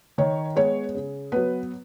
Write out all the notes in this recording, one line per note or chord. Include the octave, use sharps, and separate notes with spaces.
D#3 C#5
G#3 B3 C#5
C#3
F#3 B3 B4